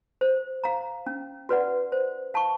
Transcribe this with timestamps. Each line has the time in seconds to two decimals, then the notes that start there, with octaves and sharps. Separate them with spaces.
0.21 C5
0.64 F5 A#5
1.07 C#4
1.49 F#4 B4 D5 F#5
1.92 C5
2.34 F5 A5 C#6